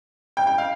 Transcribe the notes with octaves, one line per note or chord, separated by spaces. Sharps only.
G5
G5
F5